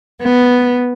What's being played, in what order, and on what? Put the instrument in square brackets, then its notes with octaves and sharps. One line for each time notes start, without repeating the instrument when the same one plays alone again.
[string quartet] B3